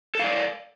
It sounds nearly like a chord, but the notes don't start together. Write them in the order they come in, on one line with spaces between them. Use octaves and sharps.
A4 F5 D5